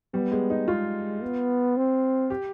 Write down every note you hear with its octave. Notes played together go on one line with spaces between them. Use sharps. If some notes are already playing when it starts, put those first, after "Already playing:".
G3 B3
G#3
D#4
G#3 F4
B3
C4
G4